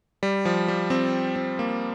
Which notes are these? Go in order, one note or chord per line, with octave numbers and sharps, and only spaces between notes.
G3
F3
G3
C4
C4
A#3